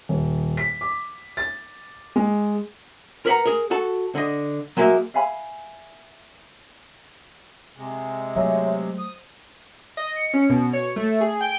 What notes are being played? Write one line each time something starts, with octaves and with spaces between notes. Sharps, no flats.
D#1
B6
D6
A6
G#3
A#4 B4 C#5 F#5 A#5
G#4 A#4
F#4 A4 A5
D3 D#5
F#3 G#3 A#3 E5
E5 F5 G#5 B5
C3 G#3
F#3 A3 G#4 C#5 E5
C5
D#6
D#5
C#7
C#4
B2
C#5
A3
G#4
G5